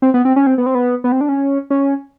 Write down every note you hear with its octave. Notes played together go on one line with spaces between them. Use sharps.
C4
B3
C4
C#4
C4
B3
C4
B3
B3
C4
D4
C#4
C#4